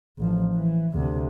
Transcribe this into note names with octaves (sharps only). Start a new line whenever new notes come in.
A1 F3
E3
D2 C3